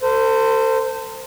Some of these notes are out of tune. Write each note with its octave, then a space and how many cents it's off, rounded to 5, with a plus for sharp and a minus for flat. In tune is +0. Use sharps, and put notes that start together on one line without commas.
A4 +35 C5 -15